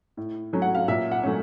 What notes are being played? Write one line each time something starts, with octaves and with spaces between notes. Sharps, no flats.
A2
F#3 A3 C#4
F#5
F5
A#2 E5
F#5
F#3 A3 C#4